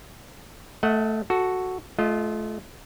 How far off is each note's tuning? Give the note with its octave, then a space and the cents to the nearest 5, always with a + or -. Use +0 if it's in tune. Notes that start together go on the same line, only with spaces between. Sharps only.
A3 +0 D#5 +35 F#5 +0
F#4 +0 A4 +0
A3 -30 F4 +0 D#5 +0